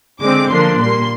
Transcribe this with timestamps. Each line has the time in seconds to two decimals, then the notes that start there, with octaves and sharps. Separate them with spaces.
0.21 D3 G#3 C4 D6
0.50 D3 F3 A#3 D4 C6
0.78 A#2 G3 A#3 C6